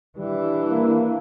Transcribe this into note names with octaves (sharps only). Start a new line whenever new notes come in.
E3 G3 D4
A#3